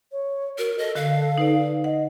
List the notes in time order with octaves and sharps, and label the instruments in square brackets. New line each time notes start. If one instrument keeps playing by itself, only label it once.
[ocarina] C#5
[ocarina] F#4 [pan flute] A#4
[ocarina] A4 [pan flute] D#5
[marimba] D3 [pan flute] F5
[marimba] D#4 B4 D5
[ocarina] D#5 [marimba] F#5